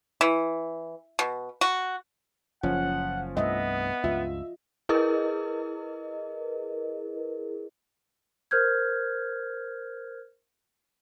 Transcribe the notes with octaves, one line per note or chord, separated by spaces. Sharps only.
E3
B2
F#4
F#1 F3 C#4 F#5
C2 G2 A3 B3 D#5 E5
C#2 G2 F4 E5
E4 G#4 A#4 B4 D#5
A#4 C5 F6 G6 G#6